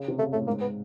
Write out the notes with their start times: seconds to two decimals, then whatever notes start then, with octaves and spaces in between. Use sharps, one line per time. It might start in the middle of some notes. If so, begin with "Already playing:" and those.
Already playing: C#3
0.08 C3
0.19 C#3 A3
0.33 A2 A3
0.47 G#2 A#3
0.61 B3